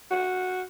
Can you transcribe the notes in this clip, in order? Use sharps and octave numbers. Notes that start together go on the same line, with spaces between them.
F#4